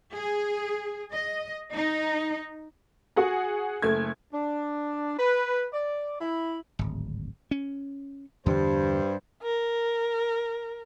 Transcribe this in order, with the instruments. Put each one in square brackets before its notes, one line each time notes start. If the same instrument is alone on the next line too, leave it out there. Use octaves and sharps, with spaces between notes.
[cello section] G#4
D#5
D#4
[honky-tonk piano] F#4 G#4 F#5 G#5
F#1 A3 G#6
[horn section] D4
B4
D5
E4
[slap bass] D1 G#1
C#4
[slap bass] E2 D3 [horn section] G2 C5
[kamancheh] A#4